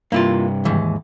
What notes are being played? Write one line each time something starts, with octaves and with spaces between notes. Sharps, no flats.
G2 C3 A#3 E4 F4
D#2 G#2 E3